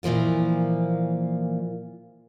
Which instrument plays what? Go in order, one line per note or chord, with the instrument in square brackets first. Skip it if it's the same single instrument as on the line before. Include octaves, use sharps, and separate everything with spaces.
[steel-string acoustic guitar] A#2 E3 F3 A#3 F4